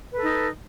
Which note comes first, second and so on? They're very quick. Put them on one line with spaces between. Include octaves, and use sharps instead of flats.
B4 A4 D#4